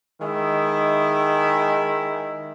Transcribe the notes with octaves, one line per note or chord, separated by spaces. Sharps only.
D#3 G#3 E4